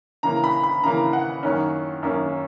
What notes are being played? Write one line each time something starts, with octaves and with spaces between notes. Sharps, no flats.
C#3 E3 A#3 A#5
B5
B5
C#3 E3 A#3 A#5
F#5
F#2 D#3 A#3 C#4
F#2 D#3 A#3 C#4